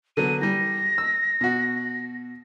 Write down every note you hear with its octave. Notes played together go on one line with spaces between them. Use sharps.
D3 F#3 B3 D#7
E3 G3 A#6
E6
B2 F#4